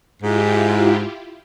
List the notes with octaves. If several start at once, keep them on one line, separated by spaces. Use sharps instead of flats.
G#2 E4 F4 G4